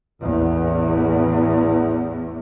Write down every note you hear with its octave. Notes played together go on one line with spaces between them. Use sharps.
A1 E2